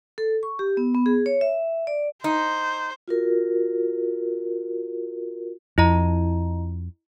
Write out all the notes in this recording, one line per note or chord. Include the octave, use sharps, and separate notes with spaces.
A4
C#6
G4
B3
B3
G#4
C#5
E5
D5
D#4 C5
F4 F#4 A#4
F2 E4 D#5 A#5